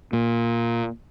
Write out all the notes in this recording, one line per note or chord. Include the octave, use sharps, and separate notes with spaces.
A#2